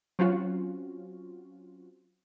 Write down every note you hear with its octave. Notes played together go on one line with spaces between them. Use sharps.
F#3 C4 C#4 F4 F#4